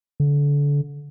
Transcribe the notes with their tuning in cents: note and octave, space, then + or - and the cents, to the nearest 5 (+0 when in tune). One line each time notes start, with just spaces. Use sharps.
D3 -30